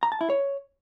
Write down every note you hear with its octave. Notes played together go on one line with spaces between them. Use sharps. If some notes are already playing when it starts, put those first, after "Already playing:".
A#5
A5
E4
C#5